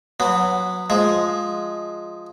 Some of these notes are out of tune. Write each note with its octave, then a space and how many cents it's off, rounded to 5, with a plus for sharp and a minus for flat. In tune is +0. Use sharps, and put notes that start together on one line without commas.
F#3 -15 B3 +0
F3 +10 G#3 +5